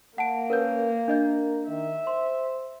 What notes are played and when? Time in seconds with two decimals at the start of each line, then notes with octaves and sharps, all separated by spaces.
0.18 A#3 F#5 A5 D7
0.50 C#4 A#4 B4 G6
1.08 D4 A#4 D#5 G6
1.69 D#3 E5
2.07 C5 C6